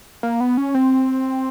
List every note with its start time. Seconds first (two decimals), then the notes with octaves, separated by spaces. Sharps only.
0.23 A#3
0.40 B3
0.57 C#4
0.75 C4